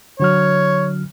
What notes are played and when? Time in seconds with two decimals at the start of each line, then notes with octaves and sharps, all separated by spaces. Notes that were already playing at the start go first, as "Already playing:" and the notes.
0.20 D3 F#3 C#5 F6